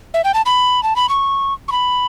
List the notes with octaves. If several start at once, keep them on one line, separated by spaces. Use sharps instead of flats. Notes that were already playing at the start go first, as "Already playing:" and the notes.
E5
G5
A5
B5
A5
B5
C#6
C#6
B5